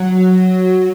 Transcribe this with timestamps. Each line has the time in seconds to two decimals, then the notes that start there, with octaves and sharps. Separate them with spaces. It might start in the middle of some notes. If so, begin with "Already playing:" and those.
Already playing: F#3